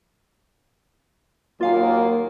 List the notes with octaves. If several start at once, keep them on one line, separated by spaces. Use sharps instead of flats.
D#2 F#3 A#3 F4 F5 G#5